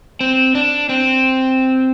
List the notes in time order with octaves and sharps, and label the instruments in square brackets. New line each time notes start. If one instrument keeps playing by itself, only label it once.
[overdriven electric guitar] C4
D4
C4